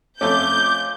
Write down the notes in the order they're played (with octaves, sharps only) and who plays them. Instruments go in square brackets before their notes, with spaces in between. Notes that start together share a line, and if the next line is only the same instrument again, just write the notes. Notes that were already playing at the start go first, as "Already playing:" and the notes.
[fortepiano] F2 A3 C#4 [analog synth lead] D6 [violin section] G6